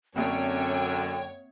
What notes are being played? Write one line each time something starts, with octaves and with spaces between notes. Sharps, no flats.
F#2 D3 A#3 C4 C#5 G5